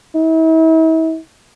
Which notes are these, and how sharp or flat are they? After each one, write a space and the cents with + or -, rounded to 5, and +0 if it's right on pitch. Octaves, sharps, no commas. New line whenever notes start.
E4 -40